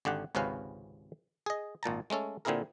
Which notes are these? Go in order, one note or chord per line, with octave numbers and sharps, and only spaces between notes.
G#1 D3 G4 F#5
G#1 C#2 C3 C#4 B4 F5
G#4 D#5
G#1 A#2 A5 A#5
G#3 A3 C#4 A4
A#2 D3 C4 E4 G#4 A#4